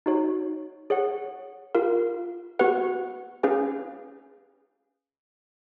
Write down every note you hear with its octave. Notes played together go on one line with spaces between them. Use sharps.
D#4 F#4 C#5
G#4 C#5 F#5
F4 A#4 F5
B3 F#4 B4 F#5
C#4 G#4 B4 F5 G#5